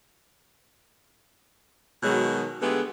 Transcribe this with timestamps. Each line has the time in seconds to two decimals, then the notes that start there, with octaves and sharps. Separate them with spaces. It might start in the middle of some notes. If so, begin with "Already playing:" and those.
2.03 B2 D#3 F#3 G#3
2.61 D3 G#3 A3 B3 G4 G#4